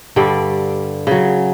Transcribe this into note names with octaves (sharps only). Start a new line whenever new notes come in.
G2 D3 G3 D5
C#3 F#3